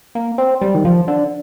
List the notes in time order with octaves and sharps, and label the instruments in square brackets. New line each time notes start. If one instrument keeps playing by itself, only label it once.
[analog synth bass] A#3
C4
G3
D#3
F3
D3